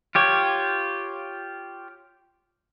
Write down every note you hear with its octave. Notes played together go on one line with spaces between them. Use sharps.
F4 G4 C#5